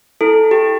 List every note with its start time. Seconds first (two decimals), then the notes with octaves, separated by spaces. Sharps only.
0.21 E4 A4
0.51 G4